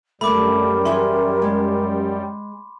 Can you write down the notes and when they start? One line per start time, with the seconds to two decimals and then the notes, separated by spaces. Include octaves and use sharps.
0.21 F#2 D3 G3 A3 A#4 B5 D6
0.85 E3 G#4 E5 C6
1.42 G#3